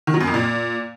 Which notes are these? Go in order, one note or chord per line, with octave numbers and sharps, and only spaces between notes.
D#3
F#3
F#2
F2
A#2